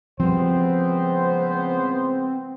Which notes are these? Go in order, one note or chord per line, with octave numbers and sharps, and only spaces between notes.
C#2 F3 G3 B3 C4 C5